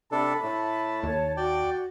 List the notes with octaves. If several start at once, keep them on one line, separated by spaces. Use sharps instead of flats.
C3 D4 A4 A5 B5
A2 A3
D#2 C#5
F#4 D5 G5